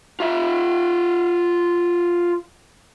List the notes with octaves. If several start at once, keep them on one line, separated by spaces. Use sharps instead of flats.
F4 E5